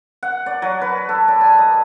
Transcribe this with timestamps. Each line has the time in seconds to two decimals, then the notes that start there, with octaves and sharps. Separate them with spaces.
0.23 F#5
0.46 D5
0.62 F#3
0.81 B4
1.09 A4
1.28 D5
1.41 G#5
1.58 D#5